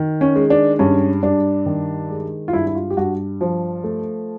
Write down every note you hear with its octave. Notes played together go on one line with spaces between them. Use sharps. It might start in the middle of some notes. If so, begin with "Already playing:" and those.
Already playing: D#3
C#4
G#3
D4
G2 C#4
G2 D4
D#3
G#3
F4
G2 E4
E4
F4
G4
G2 F#4
F3
A3